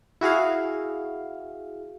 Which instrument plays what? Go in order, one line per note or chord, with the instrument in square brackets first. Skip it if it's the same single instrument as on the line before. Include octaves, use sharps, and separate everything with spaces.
[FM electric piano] E4 F#4 G#4 F5